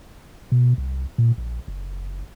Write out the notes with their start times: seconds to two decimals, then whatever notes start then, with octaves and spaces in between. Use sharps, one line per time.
0.52 B2
0.78 C2
1.18 A#2
1.38 A#1
1.68 F#1